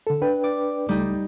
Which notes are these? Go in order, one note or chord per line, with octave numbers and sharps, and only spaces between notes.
D3 A4
D4 B4 G5
D5
C#2 G3 A3 D#4